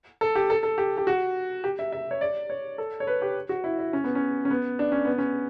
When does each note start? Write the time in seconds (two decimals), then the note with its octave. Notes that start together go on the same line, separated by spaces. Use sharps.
0.21 A4
0.35 G4
0.50 A4
0.63 A4
0.78 G4
0.97 G4
1.07 F#4
1.64 G4
1.79 E5
1.92 E5
2.11 C#5
2.21 D5
2.50 C#5
2.78 A4
3.00 C#5
3.07 B4
3.22 G4
3.49 F#4
3.64 E4
3.79 E4
3.93 C#4
4.04 B3
4.15 C#4
4.45 C#4
4.50 B3
4.79 D4
4.92 C#4
5.05 B3
5.18 C#4